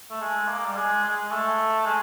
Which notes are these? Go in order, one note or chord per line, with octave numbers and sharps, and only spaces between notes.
A3
G#3
A#3
G3
G#3
G#3
A3
G#3